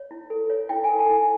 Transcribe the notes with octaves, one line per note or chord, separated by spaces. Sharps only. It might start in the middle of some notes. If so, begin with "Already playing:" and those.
Already playing: C#5
E4
A4
C#5
E4 G5
G#5
A4
A5
E4